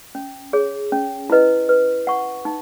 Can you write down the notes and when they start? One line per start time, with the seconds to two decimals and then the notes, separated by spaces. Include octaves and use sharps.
0.15 C#4
0.53 G#4 C#5
0.92 C#4
1.30 E4 B4 D#5
1.69 B4
2.07 F#5 C#6
2.45 D#4